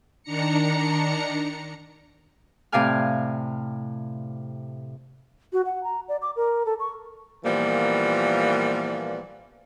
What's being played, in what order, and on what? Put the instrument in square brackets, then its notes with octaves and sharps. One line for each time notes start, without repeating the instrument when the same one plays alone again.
[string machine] D#3 D4 A#5 C#7
[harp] A2 C3 D5 F5 G#5 F6
[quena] F#4
F#5
A#5
D5
D6
A#4
A4
C#6
[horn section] A#2 E3 F3 G3 A#3 B3